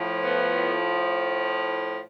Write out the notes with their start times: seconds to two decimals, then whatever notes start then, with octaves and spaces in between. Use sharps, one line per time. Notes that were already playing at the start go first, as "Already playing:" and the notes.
Already playing: A2 F3
0.24 B3